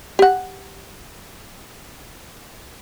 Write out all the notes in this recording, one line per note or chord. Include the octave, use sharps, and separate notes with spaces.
G4 F#5